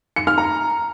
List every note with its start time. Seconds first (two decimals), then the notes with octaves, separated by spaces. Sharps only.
0.16 C#7
0.27 F6
0.38 A#5